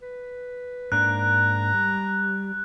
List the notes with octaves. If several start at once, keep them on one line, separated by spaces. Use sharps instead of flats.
B4
G#2 A#3 D4 A#5 F#6
G3